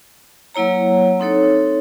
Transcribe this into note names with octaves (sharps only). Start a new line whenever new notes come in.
F#3 A#3 E4 C#5 A#5
C4 D#4 A4 C#5